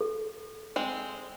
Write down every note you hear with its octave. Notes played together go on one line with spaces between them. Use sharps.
A4
G#3 C4